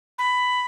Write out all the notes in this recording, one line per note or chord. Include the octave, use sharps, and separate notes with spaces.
B5